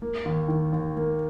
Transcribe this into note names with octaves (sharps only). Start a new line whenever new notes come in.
A#3
D#2
D#3
D#2
A#3